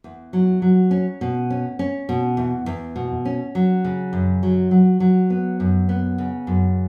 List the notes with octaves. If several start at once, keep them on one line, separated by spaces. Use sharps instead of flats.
E2
F#3
F#3
C#4
B2
C#4
C#4
B2
E2
E2
B2
C#4
F#3
C#3
F#2
F#3
F#3
F#3
B3
F#2
B3
C#3
F#2